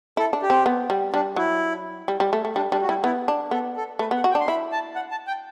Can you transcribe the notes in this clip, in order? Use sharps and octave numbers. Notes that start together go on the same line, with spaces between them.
E4 A4
D4
G4
C4
B3
G3
G3 D4
F#3 E4
G3
G3
A3
A3
G3 D4
G3 D4
F#4
G3 E4
B3 E4
D4
B3 A4
A4
A3 B4
B3 F#5
F#4
G5
D4
C6
E4 B5
A5
F#5
A5
G5